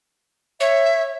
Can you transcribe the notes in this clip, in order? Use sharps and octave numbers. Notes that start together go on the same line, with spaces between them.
C#5 E5